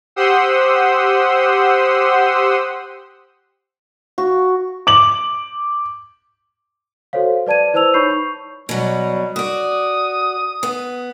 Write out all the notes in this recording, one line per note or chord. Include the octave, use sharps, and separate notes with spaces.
G4 C5 F#5 C6 D#6 E6
F#4
D6 F#7
F#4 A4 C5 C#5 F5
B4 D5 A5 G#6 D#7
E4 B4 C5 A5 E6 F7
D#4 C#5 B5 C#6 G6 C7
C#6
B2 F#3 G3
F#4 D5 D#6
B3